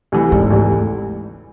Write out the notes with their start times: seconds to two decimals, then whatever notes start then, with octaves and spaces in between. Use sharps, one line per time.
0.12 D2 C3 E3
0.31 E1 G#2
0.50 D2 C3 E3